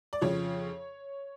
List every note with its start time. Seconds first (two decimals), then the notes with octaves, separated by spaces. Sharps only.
0.13 D5
0.21 F2 C#3 F3 C#5